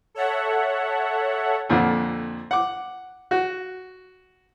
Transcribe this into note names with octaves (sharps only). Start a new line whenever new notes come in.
A4 C#5 E5 F#5
F2 A#2 D3
F#5 D6
F#4